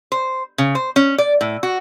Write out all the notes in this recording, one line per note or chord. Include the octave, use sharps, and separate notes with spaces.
C5
C#3
C5
C#4
D5
A2
F#4